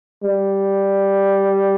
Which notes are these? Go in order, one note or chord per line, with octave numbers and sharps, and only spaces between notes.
G3